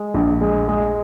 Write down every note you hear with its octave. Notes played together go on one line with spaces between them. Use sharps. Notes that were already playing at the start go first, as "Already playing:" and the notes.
Already playing: G#3
A#1
G#3
G#3